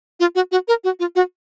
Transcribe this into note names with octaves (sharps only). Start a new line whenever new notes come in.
F4
F#4
F#4
A#4
F#4
F4
F#4